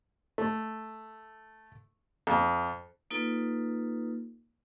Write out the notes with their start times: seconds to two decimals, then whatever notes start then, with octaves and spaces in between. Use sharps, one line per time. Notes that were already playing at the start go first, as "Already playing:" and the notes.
0.38 A3
2.27 F2
3.11 A#3 D#4 F4 A4 B4